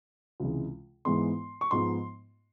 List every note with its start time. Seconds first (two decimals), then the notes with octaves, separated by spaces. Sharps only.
0.40 C#2 C3 E3 G#3
1.05 G#2 E3 G#3 B3 C6
1.61 C#6
1.71 G#2 F3 G#3 B3 D#4 C6